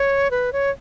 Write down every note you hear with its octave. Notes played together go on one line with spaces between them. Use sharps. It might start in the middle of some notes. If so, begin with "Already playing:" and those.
Already playing: C#5
B4
C#5